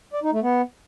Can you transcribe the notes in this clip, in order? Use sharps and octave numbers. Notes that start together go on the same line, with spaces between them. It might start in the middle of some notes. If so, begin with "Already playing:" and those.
D5
D#4
A3
B3